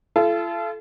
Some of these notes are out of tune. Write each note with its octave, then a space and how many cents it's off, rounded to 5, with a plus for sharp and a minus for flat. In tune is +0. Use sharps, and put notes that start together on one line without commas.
F4 -40 A4 -25